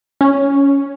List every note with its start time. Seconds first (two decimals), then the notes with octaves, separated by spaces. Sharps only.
0.21 C#4